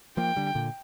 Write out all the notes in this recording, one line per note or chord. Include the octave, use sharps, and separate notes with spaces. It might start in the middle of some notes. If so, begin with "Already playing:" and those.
F3 A#3 G5
D3 G3
A#2 D3